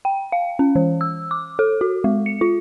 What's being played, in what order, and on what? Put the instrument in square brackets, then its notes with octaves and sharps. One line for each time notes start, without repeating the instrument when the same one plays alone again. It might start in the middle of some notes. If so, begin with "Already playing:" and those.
[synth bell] G5
F5
C#4
E3
E6
D6
A4
F#4
G#3
C#7
F4